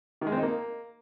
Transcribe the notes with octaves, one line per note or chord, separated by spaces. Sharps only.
D#3
G#3
C4
D#4
A#3